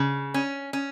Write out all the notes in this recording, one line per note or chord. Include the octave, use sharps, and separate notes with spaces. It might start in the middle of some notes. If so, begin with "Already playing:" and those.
Already playing: C#3
C#4
C#4